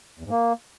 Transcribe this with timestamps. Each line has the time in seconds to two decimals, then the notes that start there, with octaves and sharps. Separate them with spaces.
0.19 E2
0.25 G#2
0.30 A#3